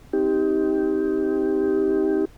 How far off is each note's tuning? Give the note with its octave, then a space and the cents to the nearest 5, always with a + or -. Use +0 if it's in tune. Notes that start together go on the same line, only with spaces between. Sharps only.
C4 +0 D#4 +25 G4 +0